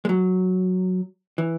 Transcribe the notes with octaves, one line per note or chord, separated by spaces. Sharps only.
G#3
F#3
E3